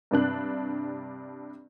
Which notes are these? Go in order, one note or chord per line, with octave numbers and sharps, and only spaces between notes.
G2 C3 D4 F#6